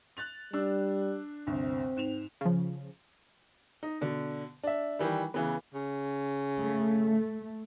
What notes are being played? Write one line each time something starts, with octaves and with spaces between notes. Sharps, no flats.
F#6 A6 F7
G3 D4 E6 F#6
G1 D2 C3 C4
G#2 E7 F7
C#3 F3
D#4
B2 D3
D4 E5
D#3 E3 G3
C#3 E3 B3
C#3
A3